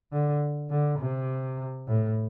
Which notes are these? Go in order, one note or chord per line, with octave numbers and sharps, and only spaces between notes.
D3
D3
C3
A2